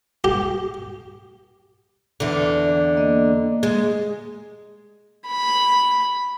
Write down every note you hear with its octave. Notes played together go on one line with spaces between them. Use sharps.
G4
E2 D3
A#3 D#5
G#3
B5